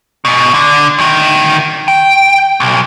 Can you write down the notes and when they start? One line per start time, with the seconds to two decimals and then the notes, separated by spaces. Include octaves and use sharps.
0.25 G#2 B2
0.54 D3
0.98 D2 D#3
1.88 G5
2.60 B1